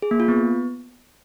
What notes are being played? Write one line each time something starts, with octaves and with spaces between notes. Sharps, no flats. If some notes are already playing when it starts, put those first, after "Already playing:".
G#4
A#3
F4
B3